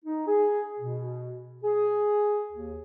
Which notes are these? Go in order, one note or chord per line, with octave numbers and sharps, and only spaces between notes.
D#4
G#4
B2
G#4
D#2